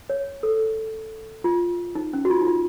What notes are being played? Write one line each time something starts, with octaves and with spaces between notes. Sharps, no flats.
C#5
A4
F4
D#4
C#4
F#4
F4
D#4
F4